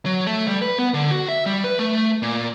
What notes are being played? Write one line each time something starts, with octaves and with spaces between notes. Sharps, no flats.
F#3
A3
G3
B4
B3
D3
F#4
E5
G3
B4
A3
A#2